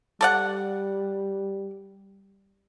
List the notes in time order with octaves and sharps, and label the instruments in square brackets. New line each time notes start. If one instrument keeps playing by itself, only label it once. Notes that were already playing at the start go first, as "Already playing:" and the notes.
[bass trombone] G3 [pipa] A4 D5 F#5